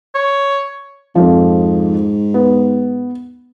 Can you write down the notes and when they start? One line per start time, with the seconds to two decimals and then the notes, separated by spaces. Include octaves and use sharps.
0.15 C#5
1.15 F2 G#2 F3
2.34 B3